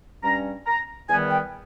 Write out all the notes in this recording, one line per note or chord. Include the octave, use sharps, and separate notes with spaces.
G2 G3 C#4 A#5
A#5
E2 D#3 G3 B3 G#5
G5